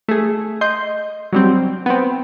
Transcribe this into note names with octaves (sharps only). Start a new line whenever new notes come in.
A3 G#4
D#5 C6 G6
F#3 G3 C4
B3 C4